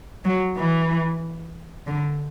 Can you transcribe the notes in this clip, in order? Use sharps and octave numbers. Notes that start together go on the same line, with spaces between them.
F#3
E3
D3